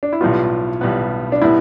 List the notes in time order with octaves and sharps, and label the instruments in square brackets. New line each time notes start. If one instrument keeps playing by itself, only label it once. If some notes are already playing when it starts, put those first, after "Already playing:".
[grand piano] D4
E4
[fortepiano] B1 A2 G3 B3 [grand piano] F4
[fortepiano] B1 A2 G3 B3
[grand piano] D4
[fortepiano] A2 G3 B3 [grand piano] E4